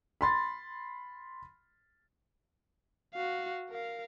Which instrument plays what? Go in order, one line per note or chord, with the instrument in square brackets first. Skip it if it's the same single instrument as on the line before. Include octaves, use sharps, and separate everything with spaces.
[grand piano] B5 C6 A6
[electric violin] F#4 F5
A#4 F5